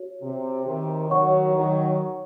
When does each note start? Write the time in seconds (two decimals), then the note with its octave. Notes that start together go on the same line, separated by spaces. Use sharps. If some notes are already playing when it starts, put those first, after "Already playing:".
Already playing: F#4 C#5
0.22 C3
0.65 C3 D#3
1.10 D#3 F#3 C#5 F#5 C#6
1.54 D#3 F#3